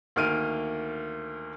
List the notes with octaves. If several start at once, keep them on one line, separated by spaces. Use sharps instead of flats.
D2 D#3 A#3 F6 D7 D#7